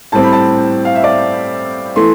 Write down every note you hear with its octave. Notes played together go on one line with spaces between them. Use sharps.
A2 G3 C4 A5
B5
A5
F5
E5
D5
E3 A3 C6